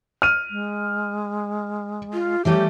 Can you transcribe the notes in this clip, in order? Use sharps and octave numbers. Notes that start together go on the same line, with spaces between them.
F6 D#7
G#3
F4
E3 G3 A3 G4 C#5